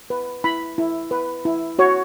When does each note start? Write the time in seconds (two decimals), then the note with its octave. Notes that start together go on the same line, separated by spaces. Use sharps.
0.10 B4
0.44 E4 B5
0.78 E4
1.11 B4
1.45 E4
1.79 F#4 C#5